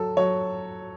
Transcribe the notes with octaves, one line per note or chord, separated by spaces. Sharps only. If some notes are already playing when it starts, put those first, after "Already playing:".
Already playing: F#3 A4
F#3 C#5